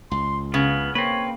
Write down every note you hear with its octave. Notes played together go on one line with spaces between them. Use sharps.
C#2 C6
C#3 B3 F5
A#3 C4 B4 C#5